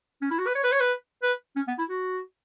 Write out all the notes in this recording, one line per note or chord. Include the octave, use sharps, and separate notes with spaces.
C#4
E4
F#4
B4
C#5
B4
C#5
B4
B4
C#4
B3
E4
F#4